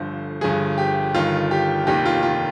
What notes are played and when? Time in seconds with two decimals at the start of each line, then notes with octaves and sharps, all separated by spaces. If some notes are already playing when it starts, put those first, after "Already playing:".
Already playing: G1 G2 D3 F3 C5
0.41 G1 G2 F3 G#4
0.78 G4
1.15 G1 G2 D#3 F4
1.51 G4
1.87 F1 D#2 D#3 G4
2.06 F4
2.23 F4